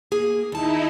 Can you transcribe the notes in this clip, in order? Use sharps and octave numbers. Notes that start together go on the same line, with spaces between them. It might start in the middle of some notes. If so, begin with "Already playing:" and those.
A#3 G#4
D#2 D#4 E4 A5